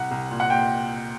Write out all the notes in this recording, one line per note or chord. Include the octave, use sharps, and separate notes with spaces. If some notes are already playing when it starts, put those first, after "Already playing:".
Already playing: C2 F#5
C2
A#2
F#5
A#2 G5